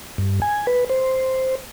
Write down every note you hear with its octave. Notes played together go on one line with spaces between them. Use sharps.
G2
G#5
B4
C5